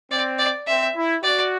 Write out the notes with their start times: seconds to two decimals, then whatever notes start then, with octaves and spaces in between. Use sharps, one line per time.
0.11 C4 D5
0.39 D5
0.67 C4 E5
0.96 E4
1.23 F#4 D5